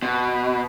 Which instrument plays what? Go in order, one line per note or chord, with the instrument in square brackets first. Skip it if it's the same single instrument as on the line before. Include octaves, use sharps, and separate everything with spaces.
[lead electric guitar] B2